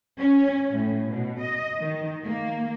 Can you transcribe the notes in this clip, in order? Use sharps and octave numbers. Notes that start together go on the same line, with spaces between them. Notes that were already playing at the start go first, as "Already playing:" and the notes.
C#4
A2
B2
D#5
D#3
A#3